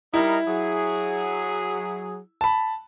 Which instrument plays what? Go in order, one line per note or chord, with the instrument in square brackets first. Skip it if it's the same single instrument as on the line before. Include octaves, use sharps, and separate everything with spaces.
[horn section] G3 D#4 A#4 [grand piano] E4
[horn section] F#3 G#4
[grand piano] A5 B5